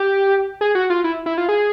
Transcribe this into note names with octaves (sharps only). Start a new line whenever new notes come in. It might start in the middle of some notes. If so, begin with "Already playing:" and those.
Already playing: G4
G#4
F#4
F4
E4
E4
F4
G#4